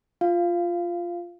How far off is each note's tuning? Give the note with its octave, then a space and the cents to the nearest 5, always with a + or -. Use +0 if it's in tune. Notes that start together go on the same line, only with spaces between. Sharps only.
F4 +0 F5 -15